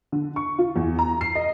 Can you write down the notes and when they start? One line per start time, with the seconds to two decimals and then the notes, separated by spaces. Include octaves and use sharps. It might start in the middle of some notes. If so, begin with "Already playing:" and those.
0.12 D3
0.36 C#6
0.58 F4
0.76 E2
0.99 A#5
1.21 C7
1.35 D#5